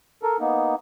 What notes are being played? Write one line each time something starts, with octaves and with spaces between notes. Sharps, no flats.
A4 A#4
A#3 B3 D#4